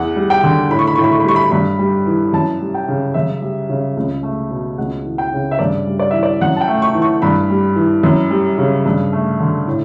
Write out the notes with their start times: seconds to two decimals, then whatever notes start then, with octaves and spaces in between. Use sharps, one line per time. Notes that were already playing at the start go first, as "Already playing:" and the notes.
Already playing: E2 F#5
0.16 G3
0.30 G5
0.43 D3
0.70 A2 B5
0.79 C#6
0.87 B5
0.96 A2 C#6
1.04 B5
1.11 C#6
1.20 B5
1.24 G3 C#6
1.36 B5
1.51 G2 B5
1.79 G3
2.07 E3
2.33 F#2 A5
2.60 G3
2.74 G5
2.88 C#3
3.14 F#2 E5
3.42 G3
3.69 C#3
3.97 C#2
4.23 A3
4.51 B2
4.78 C#2 F#5
5.04 E3
5.18 G5
5.32 C#3
5.51 E5
5.59 G2 D5
5.87 G3
5.99 D5
6.11 E3 E5
6.23 D5
6.41 F#2 F#5
6.56 A5
6.61 G5
6.68 A3
6.82 C#6
6.95 E3
7.02 C#6
7.22 G2 B5
7.50 G3
7.76 E3
8.03 F#2
8.30 G3
8.58 C#3
8.86 G2
9.13 A3
9.40 D3
9.67 A2